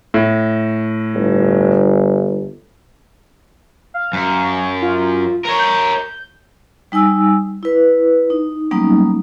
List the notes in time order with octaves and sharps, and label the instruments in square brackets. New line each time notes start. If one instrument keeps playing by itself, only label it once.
[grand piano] A2
[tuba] G1
[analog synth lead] F5
[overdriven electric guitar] F#2
[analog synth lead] F4
[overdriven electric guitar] A#4 C#5
[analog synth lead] G6
[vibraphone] G3 D#4 G#5 E6
E4 B4
D#4
F#3 G3 A#3 B3 C#4 D#4